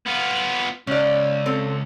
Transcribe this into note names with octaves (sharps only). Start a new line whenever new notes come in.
B3 F4
C#2 C#4 D5
C4 A4